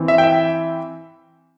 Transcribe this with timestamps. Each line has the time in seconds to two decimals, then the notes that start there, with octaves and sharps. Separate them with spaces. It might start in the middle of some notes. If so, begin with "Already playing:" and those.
Already playing: E3 C4
0.08 E5
0.18 G5
0.24 E5